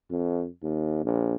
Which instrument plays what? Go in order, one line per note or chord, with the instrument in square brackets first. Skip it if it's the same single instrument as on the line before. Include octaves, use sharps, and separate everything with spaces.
[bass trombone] F2
D#2
A#1